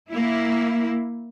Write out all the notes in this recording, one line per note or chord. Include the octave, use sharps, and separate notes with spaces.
A#3 E4